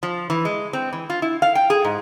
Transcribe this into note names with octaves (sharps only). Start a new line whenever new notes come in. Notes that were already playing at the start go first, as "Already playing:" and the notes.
F3
E3
G#3
C4
E3
F4
E4
F5
G5
G#4
G#2